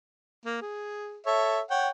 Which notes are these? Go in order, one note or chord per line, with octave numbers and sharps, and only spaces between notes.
A#3
G#4
A4 C#5 E5
C#5 F#5 G5